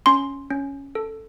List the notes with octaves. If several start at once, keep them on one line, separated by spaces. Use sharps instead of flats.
C#4 C6
C#4
A4